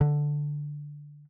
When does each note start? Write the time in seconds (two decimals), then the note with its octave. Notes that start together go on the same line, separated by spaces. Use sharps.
0.01 D3